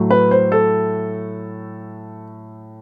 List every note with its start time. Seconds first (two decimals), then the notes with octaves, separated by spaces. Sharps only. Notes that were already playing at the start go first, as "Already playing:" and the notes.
Already playing: A2 F#3 A3
0.11 B4
0.31 C5
0.52 A4